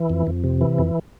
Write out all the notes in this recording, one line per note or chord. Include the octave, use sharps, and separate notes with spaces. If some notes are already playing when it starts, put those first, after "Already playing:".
Already playing: E3
F2
F2
C3
E3
F2